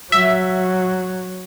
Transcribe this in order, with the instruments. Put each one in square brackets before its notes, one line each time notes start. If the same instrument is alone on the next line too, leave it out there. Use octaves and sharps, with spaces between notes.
[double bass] F#3 [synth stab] E5